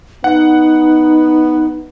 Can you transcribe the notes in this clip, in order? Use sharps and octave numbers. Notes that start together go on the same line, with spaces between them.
B3 D#4 F#5